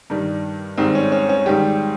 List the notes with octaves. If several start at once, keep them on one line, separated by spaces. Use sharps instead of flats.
G2 D#3 G3
G#2 D#3 G3 C4
C#4
C#4
C#4
G#2 D#3 G3 G4